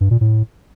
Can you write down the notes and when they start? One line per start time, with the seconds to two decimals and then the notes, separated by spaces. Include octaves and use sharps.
0.01 G2
0.11 A#2
0.21 A2